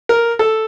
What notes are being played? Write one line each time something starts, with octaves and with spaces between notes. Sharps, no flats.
A#4
A4